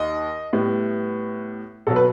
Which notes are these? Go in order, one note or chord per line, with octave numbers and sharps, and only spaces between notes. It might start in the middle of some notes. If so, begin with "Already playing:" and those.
Already playing: D#2 D#5
A2 G3 B3
B2 F#3 B3 A4
B4